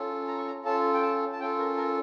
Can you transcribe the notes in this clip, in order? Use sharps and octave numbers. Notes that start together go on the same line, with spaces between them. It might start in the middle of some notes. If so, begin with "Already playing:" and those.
Already playing: C#4 F4 A4
A#5
C#6
A#5
C#4 F4 A4 A5
G5
A5
A5
C#4 F4 A4 G5
A#4
A#4